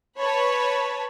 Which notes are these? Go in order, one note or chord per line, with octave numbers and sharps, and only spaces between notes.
B4 C#5 A5 B5